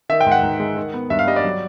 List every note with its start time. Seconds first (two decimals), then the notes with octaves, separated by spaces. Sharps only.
0.09 D#3 E5
0.21 G5
0.26 G#2
0.31 F#5
0.43 G#2
0.60 G#3
0.76 D#3
0.94 B3
1.10 G2 E5
1.19 F5
1.27 G3 D#5
1.36 D5
1.44 F#3